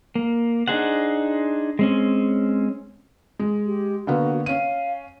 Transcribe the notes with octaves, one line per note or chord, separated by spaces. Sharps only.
A#3
D4 D#4 G#4 C5 F#5
G#3 C4 C#4
G#3
G4
D3 A#3 B3 F#4
C#4 F5 D#7